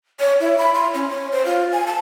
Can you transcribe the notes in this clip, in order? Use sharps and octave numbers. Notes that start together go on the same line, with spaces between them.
C#5
E4
B5
C6
C#4
C#5
C5
F4
G#5
A5